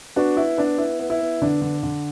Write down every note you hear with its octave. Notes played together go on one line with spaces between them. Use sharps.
B3 D4 F#4
B3 E4
B3 D4
B3 E4
B3
E4
B3
D3 D4
D3
D3